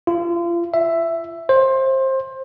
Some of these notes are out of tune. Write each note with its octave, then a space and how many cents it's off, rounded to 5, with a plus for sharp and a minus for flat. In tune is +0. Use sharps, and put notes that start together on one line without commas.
F4 -35
E5 +10
C5 +20